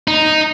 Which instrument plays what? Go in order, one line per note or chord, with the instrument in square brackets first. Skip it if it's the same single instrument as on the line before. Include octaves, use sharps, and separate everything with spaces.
[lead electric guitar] D#4